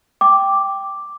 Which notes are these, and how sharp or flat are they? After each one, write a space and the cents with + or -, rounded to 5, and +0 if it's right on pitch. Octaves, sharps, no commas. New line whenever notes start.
G5 +0 D6 +0